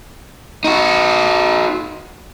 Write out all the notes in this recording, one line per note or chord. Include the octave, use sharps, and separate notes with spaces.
D#4 F#4